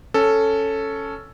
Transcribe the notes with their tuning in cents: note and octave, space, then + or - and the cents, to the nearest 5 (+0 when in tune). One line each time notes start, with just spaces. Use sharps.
C#4 +0 A4 +0